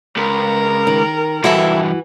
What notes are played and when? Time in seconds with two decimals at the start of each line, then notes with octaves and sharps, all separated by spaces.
0.17 C#2 A#4
0.87 D#3
1.44 E2 G2 E3 E4 F#4 A4